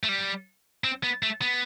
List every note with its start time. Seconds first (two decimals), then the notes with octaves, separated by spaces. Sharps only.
0.04 A3
0.09 G3
0.84 C4
1.03 B3
1.23 A3
1.42 B3